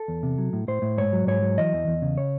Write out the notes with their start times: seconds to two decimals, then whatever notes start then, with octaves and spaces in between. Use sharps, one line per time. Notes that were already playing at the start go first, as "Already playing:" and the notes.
Already playing: A4
0.08 E2
0.23 C3
0.38 F#3
0.53 A2
0.68 A2 C5
0.82 A2
0.98 G#2 C#5
1.13 F#3
1.27 G#2 C#5
1.42 F#3
1.58 E3 D#5
1.73 E2
1.87 E2
2.02 C#3
2.18 C#5